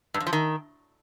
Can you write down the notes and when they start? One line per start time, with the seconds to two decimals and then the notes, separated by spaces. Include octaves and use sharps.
0.14 G2
0.20 F2
0.27 F3
0.33 D#3